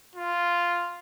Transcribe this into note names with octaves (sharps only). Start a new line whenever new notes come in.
F4